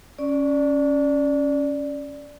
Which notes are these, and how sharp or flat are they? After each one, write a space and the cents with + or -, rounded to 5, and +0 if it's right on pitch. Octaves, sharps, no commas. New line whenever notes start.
C#4 +0 D5 +0